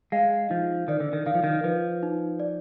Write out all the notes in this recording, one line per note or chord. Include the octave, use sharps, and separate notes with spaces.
G#3 F5
F3 D#4
D#3 D5
D3
D#3
D#3 F5
F3
D#3
F3 B4
D#4
D5